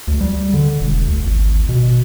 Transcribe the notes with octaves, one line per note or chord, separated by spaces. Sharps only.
D2
G3
D3
E1
D2
G#1
B2